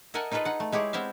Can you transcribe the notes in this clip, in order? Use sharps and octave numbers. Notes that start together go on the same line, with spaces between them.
A4 A#4 D#5 E5 F#5 G#5
D#4 F4 G#4 A4 B4 D#5
D#4 F#5
A3
G#3 E4 G4 G#4 C#5
B3 C4 E4 E5 F5